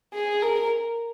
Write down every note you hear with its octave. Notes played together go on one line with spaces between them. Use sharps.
G#4
A#4